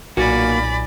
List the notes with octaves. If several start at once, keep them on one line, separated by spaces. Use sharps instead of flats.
B1 A#2 A#3 F#4 D5 G#5 B5